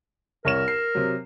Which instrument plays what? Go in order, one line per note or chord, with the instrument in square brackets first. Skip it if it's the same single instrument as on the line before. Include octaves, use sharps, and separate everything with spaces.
[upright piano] C2 C#5 E7 [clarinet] A#4
[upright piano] C7
C3 F#3